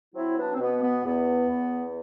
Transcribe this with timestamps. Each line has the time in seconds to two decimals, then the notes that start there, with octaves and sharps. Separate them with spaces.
0.14 F#3 C4 E4
0.37 B3 D4
0.54 C4
0.59 B2 B3
0.81 B3
1.04 E2 B3
1.49 E2